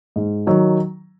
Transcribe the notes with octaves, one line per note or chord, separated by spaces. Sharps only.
G#2
D#3 F#3